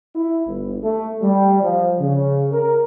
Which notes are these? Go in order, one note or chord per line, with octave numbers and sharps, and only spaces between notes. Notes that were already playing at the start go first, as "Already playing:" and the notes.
E4
G1
A3
G3
F3
C#3
A#4